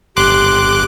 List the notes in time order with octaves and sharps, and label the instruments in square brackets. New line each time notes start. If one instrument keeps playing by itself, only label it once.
[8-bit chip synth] G1 D6 F#6 [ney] G4 [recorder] C6